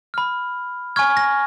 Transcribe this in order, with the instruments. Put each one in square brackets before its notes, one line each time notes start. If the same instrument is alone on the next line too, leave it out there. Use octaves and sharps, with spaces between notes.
[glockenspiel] B5 F6
G#5 C#6 F6 G#6
A#6